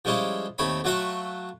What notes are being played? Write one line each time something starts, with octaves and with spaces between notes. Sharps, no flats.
F3 G3 G#3 C#4 E4 F4
D#2 A3 C4 C#5 B5
F#3 A3 F4 F#4 E5 F#5